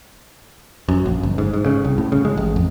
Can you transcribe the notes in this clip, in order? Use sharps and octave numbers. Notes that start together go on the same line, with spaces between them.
F#2
A#1
G1
G#2
G#2
C#3
C2
A2
C#3
G#3
A1
F2